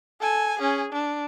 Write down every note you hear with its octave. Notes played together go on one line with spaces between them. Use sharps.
A4 G#5
C#4 G#4
D4